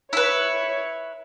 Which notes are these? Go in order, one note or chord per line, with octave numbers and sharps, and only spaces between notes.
E4 B4 C#5